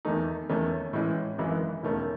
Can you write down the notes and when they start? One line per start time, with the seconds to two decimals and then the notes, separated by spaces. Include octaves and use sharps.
0.05 E2 D#3 A3 D#4
0.49 E2 D#3 A3 C#4
0.93 A2 E3 G#3 C#4 E4
1.38 G#1 F#2 E3 G#3
1.83 E1 D#2 D#3 A3 C#4